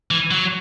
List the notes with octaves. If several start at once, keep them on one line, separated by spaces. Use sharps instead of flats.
E3
F#3